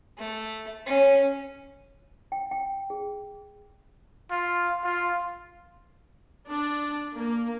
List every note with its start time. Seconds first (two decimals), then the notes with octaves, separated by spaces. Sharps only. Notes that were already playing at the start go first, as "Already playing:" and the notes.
0.18 A3
0.86 C#4
2.32 G5
2.51 G5
2.90 G#4
4.30 F4
4.84 F4
6.48 D4
7.14 A#3